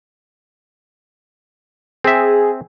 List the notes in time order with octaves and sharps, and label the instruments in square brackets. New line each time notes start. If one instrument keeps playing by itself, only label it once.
[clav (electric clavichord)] C4 E5 [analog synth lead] G#4